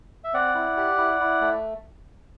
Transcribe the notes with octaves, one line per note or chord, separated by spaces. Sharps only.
E5
C4 D5 F#5
E4
G4
E4
E4
A3